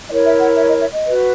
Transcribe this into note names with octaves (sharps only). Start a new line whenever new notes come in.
E4 A#4 C#5 D#5
E5
F#5
E5
D#5
E5
D#5
F#4 B4